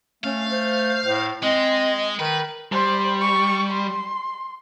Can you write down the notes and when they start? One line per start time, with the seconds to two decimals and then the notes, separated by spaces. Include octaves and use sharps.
0.24 A3 C#4 F5
0.50 C5
1.05 A2
1.43 G#3 C4 D#5
2.20 D#3 B4
2.72 G3 C5
3.21 C#6
3.71 C6